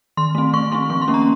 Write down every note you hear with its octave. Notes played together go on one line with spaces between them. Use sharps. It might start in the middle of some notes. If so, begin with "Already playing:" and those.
D#3 C6
A3 C4
D#3 C#6
A3 C4 C6
F3 C#6
C6
A#3 C#4
A#5